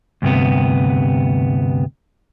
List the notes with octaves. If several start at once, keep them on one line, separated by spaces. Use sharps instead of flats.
D2 G2 C3 B3